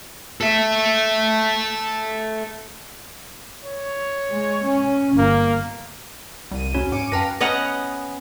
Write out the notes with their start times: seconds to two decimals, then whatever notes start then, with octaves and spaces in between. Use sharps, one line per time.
0.41 A4 E5
3.64 C#5
4.31 G#3
4.66 C#4
5.18 G1 A#3
6.51 C2 G3 D#7
6.74 D#2 C#4 F#4
6.92 G#2 C#4 D6 C#7 D#7
7.12 F#2 B4 F5 G5 A5 A#5 A#6
7.40 B3 C#4 D#5 F#5 A#5